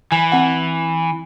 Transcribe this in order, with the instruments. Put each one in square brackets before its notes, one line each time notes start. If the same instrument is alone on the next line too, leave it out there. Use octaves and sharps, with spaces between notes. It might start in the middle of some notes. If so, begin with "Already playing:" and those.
[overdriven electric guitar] E3 [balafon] G#5
[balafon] C4 F#5